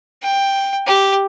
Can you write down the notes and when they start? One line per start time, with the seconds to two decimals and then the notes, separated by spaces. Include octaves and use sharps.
0.23 G5
0.87 G4